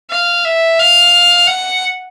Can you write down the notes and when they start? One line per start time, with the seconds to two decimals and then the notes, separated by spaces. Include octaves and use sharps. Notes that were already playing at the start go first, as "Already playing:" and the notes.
0.11 F5
0.45 E5
0.79 F5
1.47 F#5